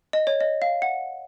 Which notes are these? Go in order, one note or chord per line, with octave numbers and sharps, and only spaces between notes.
D#5
C#5
D#5
F5
F#5